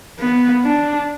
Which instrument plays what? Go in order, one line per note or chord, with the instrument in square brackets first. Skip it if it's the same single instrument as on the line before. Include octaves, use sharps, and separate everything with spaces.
[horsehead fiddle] B3
D4